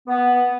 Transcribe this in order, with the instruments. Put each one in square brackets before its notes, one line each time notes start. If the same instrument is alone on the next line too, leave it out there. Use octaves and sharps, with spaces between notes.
[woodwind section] B3